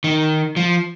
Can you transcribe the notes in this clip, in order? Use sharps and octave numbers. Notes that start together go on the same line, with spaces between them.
D#3
F3